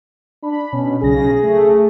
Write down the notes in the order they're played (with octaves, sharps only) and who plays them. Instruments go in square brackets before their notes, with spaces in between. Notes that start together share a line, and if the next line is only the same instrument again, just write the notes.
[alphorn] D4 [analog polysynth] B5
[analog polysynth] B2 [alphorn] C#4
[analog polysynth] B1 C#3 A#6 [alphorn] G#4
[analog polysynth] A3